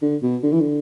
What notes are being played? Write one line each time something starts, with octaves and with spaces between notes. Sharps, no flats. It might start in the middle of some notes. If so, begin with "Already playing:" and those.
D3
B2
D3
E3
D3